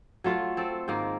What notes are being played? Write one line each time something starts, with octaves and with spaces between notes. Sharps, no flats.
F#3 A3 F4
C4 A4
G#2 D#3 A#3